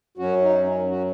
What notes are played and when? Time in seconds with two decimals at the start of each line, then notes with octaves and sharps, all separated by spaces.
0.17 F#2 F#3 C#4 F#4
0.42 D#4
0.66 C#4
0.90 F#4